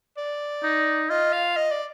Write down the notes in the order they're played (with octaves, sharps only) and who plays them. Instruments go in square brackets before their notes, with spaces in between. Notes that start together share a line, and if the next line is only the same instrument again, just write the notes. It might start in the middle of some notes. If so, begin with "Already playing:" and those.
[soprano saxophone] D5
[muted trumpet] D#4
[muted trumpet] F4 [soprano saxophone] D#5
[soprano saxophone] F5
D#5
D5